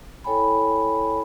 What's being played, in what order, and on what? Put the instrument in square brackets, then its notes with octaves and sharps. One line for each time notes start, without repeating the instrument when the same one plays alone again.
[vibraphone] E4 A4 C#5 G5 G#5 B5